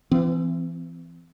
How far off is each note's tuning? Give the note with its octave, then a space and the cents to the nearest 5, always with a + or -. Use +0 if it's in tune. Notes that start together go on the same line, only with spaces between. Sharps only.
E3 +30 C4 -30